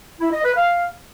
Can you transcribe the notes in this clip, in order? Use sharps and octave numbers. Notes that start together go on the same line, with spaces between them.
E4
D#5
B4
F5